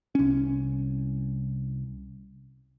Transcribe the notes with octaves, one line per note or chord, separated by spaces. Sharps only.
C2 C#4